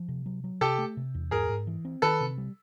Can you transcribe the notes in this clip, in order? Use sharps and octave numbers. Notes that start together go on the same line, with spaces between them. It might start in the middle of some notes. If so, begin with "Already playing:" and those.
Already playing: F3
C3
F#3
F#3
C3 G4 A4
A3
C3
E2
G#2 G#4 A#4
G#2
E3
C4
D#3 A4 B4
C3
G3